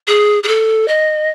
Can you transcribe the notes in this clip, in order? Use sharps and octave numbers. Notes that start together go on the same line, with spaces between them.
G#4
G#4
A4
D#5